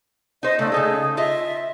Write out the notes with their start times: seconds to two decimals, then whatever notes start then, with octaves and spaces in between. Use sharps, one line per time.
0.43 D#4 C5 D#5
0.59 C#3 A3 D5
0.72 C#3 D#4 G#4 A4
1.17 F4 D#5 E5